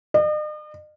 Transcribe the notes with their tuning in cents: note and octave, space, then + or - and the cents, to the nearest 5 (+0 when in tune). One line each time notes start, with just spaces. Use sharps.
D#5 -45